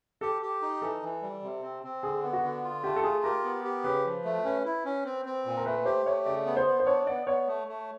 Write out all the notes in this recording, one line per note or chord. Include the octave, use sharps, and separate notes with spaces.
G4 A4
G4
D#4
E3 A4
E3
G3
C3
C4
C4
D3 G#4
B3
F#4
D3
F4
A3 G4
A4
F4 G#4
G4 A#4
B3
G4
C#3 B4
F3
A3
C#4 B4
E4
C#4
C4
C4
A#2
A#4
A3 B4
G4 C5
A3 C#5
C#3 D5
B3
C5
B3
C5
D4 C#5
B3 D5
B3 C#5
A3
A3